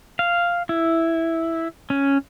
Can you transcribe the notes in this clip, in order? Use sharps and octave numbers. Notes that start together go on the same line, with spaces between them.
F5
E4
C#4